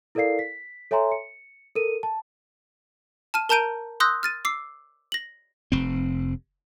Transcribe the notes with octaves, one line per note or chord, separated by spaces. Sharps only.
E4 A4 A#4 D5 F5 C7
B6
A4 C#5 E5 G#5 A#5 C6
C#7
A4 A#4 D#7
A5
A5 F6 D#7
A#4 A5 A#5 G6 D7 D#7
C6 D#6 E6 F#6 G6 A#6
F6 A6 D#7
D6 E6 C7
A#6 F#7
F1 C4